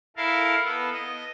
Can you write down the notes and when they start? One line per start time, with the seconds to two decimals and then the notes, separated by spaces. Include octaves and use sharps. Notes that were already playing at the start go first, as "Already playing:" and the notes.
0.17 E4 A4 A#4 F5
0.64 B3 A4
0.93 D#5